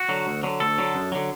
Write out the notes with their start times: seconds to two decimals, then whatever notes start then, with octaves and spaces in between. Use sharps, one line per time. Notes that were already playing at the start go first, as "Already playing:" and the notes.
Already playing: F#4
0.09 D3 F#3
0.27 D2
0.43 D3 F#3
0.60 D2 A4
0.78 D3 F#3
0.95 F#2
1.12 D3 F#3